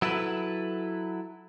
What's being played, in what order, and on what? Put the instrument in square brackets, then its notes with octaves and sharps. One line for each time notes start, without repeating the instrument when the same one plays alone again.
[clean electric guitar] F#3 E4 A4 B4